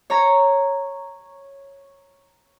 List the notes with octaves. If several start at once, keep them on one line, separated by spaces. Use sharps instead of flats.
C#5 A#5